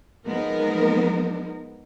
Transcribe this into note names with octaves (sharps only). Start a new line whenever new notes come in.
F3 G#3 B3 D#4 A#4